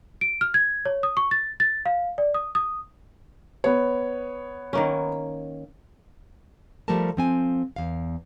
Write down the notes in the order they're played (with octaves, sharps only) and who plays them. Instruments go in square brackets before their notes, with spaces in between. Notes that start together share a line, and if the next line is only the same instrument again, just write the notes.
[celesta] D7
F6
G#6
C#5
D#6
C#6
A6
A6
F5
D5
D#6
D#6
[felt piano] B3 C#5
[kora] D#3 A#3 C#4
[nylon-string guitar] F3 G3 A3 G4 A#4 A5
F3 C4 G#5
E2 F5